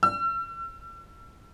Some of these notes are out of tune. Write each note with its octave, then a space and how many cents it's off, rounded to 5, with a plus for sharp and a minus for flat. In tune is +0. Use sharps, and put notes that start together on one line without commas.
E6 +40